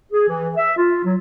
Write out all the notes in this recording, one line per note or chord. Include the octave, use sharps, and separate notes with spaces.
G#4
E3
E5
F4
F#3